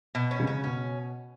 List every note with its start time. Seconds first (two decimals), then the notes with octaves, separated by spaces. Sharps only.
0.15 B2
0.31 C#4
0.40 C#3
0.47 C#4
0.64 B2 C#4